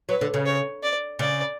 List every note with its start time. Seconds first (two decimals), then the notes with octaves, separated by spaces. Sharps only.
0.09 F#3 B4
0.21 D3
0.34 C#3
0.46 C#5
0.83 D5
1.19 C#3 D5